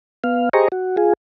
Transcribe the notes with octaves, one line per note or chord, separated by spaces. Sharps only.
B3 F5
G4 G#4 C5 D#5 A#5 C#6
F#4
F4 G#4